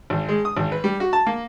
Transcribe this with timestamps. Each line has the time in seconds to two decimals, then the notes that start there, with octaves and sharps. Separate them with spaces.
0.10 G#1
0.29 G#3
0.45 D#6
0.57 G#1
0.72 B4
0.84 G3
1.00 F#4
1.13 A5
1.27 A#3